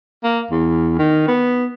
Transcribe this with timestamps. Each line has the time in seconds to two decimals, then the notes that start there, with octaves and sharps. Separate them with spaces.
0.24 A#3
0.51 E2
0.99 D#3
1.28 B3